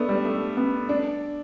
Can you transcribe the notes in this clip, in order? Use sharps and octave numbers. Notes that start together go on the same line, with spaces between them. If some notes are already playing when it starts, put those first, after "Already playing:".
Already playing: A3 B3 D4
G3
A3
B3
D4